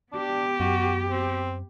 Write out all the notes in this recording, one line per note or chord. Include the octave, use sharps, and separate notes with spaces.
B3 D4 G4
F#2 F#4
C4